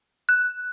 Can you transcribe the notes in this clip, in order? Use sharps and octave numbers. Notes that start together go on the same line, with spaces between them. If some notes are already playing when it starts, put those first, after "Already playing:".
F#6